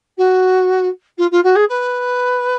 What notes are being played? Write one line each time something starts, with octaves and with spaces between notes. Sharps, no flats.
F#4
F4
F4
F#4
G#4
B4